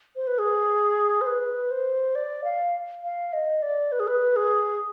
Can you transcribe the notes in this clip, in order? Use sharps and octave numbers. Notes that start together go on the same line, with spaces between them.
C5
B4
G#4
C5
B4
C5
D5
F5
F5
D#5
D5
B4
G#4
B4
G#4